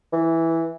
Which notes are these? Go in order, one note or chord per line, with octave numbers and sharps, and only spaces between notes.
E3